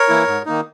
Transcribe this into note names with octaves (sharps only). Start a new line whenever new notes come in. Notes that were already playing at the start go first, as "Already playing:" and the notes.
Already playing: A#4 C#5
E3 A#3 E4
G#2
D#3 A#3 D#4